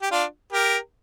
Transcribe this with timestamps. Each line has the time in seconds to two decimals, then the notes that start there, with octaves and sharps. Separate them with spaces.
0.02 G4
0.11 D4 F4
0.52 G4 A#4